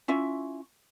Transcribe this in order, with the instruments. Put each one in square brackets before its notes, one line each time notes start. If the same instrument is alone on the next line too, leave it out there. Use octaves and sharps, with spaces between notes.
[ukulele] C#4 E4 F4 E5